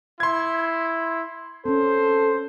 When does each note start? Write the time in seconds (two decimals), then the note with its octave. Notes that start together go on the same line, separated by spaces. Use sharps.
0.20 E4 C6 G#6
1.66 C4 C#4 A4 C5